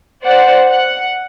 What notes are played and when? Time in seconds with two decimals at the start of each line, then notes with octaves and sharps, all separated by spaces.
0.22 C5 D5 F#5
0.68 F#5